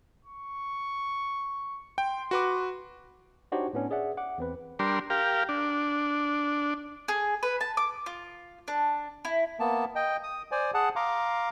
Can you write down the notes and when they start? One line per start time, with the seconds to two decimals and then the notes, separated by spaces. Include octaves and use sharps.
0.25 C#6
1.98 G5 C6
2.31 F#4 B4 D6
3.52 D4 D#4 F#4 G4 C5 C#5
3.73 A2 B3 C#4 D4
3.91 G#4 D5 E5 F#5
4.17 F#5 D6
4.38 E2 C4 B4
4.79 G3 D4 A#4 C6
5.10 G4 A#4 F5
5.49 D4
7.08 G#4
7.43 B4
7.61 A5
7.77 D6
8.06 F4
8.68 D4
9.25 E4
9.60 A#3 B3 A5
9.95 D#5 G5
10.23 D#6
10.52 C5 D5 G#5
10.74 G#4 F#5 A5
10.96 F5 A#5 C6 D6